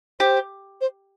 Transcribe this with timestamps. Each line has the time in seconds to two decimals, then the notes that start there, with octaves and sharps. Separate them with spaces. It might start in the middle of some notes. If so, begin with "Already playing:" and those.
0.20 G4 C5
0.81 C5